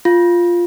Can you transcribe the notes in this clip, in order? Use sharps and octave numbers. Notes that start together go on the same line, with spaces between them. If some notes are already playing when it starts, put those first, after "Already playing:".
F4